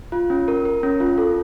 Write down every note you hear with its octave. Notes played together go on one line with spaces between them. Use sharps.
F4
C#4
A#4
A#4
C#4
F4
A4